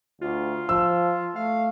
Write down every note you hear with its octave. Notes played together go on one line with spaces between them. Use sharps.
D2 F4
F3 E6
A3 F5